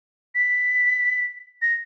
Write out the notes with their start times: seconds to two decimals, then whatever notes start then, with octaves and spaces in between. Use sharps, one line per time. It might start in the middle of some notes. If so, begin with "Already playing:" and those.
0.35 B6
1.62 A#6